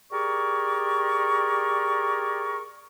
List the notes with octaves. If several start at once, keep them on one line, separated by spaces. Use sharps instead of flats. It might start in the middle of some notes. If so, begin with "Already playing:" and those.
G4 G#4 A#4 D5 C#6